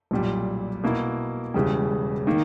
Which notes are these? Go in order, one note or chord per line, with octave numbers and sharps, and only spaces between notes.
B1 A#2 G3
B2 A#3 E4
E1 E2 C#3 E3 G3
D#3 A#3